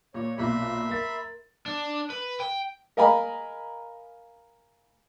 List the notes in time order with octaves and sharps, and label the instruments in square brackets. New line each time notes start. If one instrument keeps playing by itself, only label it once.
[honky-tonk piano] A#2 [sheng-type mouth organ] C#5
[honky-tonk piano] B1 A#2 [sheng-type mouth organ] E5 B5 C6
[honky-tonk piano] A#4 A6
[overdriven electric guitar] D4
B4
G5
[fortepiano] A#4 D#5 F5 G#5 A#5 B5